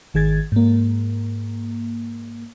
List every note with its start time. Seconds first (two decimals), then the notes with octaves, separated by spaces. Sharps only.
0.14 G#1 D#3 G#4 G#6 A6
0.52 G#2 A#3